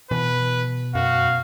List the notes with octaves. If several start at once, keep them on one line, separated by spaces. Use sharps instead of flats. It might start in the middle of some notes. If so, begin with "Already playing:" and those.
B2 E3 B4
F#2 F#4 F5